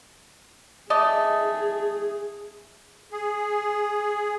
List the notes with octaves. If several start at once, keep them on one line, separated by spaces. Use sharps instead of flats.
A3 G#4 D5 D#5
G#4